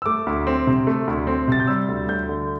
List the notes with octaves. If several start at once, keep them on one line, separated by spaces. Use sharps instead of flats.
E6
A3 D6
D2
C4
C3
A3
D2
C4
C3 A6
G6
G3 E6
D2
D2 G6
D3